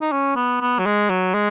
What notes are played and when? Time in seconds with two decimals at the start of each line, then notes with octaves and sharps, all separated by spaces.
0.02 D#4
0.12 C#4
0.36 B3
0.61 B3
0.79 F#3
0.86 G#3
1.10 F#3
1.34 G#3